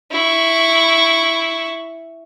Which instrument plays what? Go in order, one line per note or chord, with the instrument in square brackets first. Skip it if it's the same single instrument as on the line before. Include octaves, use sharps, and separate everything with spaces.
[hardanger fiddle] E4 C#6